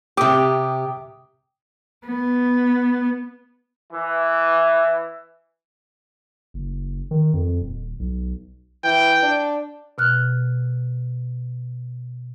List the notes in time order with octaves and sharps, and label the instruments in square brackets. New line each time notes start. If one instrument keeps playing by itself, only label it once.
[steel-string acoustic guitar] C3 G4 [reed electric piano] G5 D6 D#6
[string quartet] B3
[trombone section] E3
[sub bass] F#1
D#3
F2
D#1
B1
[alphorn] E3 [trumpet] G5
[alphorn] D4
[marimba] B2 F6 F#6